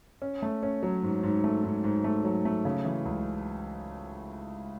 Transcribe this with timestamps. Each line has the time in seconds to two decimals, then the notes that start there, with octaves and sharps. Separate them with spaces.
0.22 C#4
0.42 A3
0.63 C#4
0.83 F#3
1.03 G#2
1.23 G#2
1.44 A3
1.64 G#2
1.84 G#2
2.04 A3
2.24 F#3
2.45 A3
2.65 C#3
2.85 E3
3.05 C#2